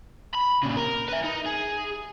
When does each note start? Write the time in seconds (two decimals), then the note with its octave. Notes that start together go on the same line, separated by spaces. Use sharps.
0.35 B5
0.63 A#2 C#3
0.77 A#4
1.09 B4 E5
1.24 D#4
1.46 G#4